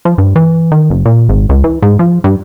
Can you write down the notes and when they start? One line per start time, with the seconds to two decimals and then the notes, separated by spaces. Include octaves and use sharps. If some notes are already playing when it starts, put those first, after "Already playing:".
0.05 F3
0.18 G2
0.36 E3
0.72 D#3
0.90 F#1
1.05 A#2
1.29 G#1
1.49 C#2
1.64 E3
1.82 G#2
1.99 F3
2.24 G2